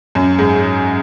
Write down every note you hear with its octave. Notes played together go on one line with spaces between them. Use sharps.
F#2
G#2